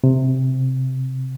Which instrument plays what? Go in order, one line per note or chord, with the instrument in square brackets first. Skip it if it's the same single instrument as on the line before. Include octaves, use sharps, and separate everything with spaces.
[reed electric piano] C3